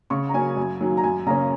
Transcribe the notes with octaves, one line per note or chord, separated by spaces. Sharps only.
C#3 C#6
A#5
F#3 A#3 C#4 G#5
F#2
D#3 F#3 A#3
A#5
F#2 G#5
C#3 A#3 C#4 A#5